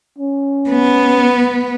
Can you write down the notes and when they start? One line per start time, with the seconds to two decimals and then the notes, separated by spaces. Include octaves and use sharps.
0.18 C#4
0.70 B3